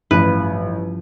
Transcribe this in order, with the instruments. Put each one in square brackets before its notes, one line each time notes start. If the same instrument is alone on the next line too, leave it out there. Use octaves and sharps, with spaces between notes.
[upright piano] A1 [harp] G2 F3 G3 [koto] B4